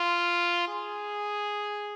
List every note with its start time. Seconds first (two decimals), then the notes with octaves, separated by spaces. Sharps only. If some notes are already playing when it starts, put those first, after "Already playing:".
Already playing: F4
0.69 G#4